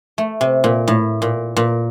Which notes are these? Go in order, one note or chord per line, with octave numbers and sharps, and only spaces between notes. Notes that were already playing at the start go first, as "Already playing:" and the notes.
A3
C3
A#2
A2
A#2
A#2